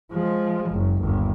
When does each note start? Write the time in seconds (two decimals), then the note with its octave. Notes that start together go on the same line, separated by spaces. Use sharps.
0.12 F3 G#3
0.70 F#1
1.00 G1 D#2